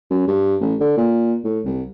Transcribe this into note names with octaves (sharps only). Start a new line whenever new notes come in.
F#2
G2
A1
D3
A#2
A2
C2